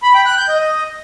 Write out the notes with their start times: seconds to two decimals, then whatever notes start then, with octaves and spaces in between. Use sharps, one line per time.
0.03 B5
0.14 G5
0.26 F#6
0.37 G6
0.49 D#5